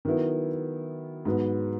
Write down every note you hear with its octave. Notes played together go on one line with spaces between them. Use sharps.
D#3 F#3 B3 E4
G#2 F#3 B3